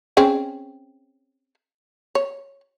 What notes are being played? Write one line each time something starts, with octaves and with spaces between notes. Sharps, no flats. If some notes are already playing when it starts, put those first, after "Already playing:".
C4 C#4 G#4
C#5